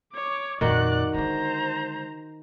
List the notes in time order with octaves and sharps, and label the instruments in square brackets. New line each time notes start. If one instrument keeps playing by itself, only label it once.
[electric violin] C#5 D6
[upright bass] F2 A#2 [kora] D#3 F#4 [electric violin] D5 F#6
[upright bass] D3 G#3 [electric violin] C5 A#5